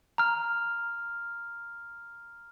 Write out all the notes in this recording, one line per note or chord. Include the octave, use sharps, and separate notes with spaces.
A#5 F6